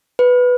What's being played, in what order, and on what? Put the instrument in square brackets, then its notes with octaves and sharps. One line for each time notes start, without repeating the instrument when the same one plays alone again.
[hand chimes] B4